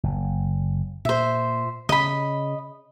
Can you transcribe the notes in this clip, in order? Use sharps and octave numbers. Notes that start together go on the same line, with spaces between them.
F#1
A#2 C5 E5
C#3 D#5 B5